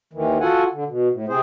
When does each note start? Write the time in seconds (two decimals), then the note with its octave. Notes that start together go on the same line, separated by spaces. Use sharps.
0.13 D#2 D#3 E3
0.41 F4 F#4 A4 F#5 G#5
0.73 D3
0.88 B2
1.12 A2
1.29 C3 C4 G#4 C5